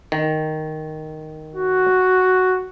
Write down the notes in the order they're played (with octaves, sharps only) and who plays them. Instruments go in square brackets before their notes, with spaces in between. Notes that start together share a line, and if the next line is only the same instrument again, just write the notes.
[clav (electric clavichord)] D#3
[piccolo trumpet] F#4